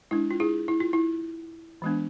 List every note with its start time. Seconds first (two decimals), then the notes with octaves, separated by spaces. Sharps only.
0.11 G#3 D4 E4
0.31 F4
0.40 E4 G#4
0.68 E4
0.80 F4
0.93 E4
1.82 E3 G#3 B3 D4